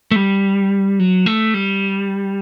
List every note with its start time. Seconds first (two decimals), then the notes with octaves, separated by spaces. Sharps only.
0.11 A3
0.16 G3
1.00 F#3
1.26 A3
1.54 G3